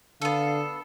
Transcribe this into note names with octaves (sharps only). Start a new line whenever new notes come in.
D3 B3 A4 F5